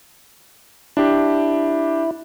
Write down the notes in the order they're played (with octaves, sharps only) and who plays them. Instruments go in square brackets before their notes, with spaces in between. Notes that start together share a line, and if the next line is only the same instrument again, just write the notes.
[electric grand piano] D4 G4 [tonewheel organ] E4